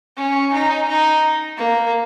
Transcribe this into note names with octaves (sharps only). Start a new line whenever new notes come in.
C#4
D#4
D#4
A#3